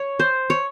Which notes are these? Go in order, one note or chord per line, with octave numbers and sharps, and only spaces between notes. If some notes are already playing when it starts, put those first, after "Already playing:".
Already playing: C#5
C5
C#5